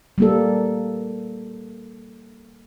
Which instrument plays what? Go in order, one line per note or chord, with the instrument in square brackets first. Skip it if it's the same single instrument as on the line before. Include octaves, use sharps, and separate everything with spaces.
[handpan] G3 A#3 A4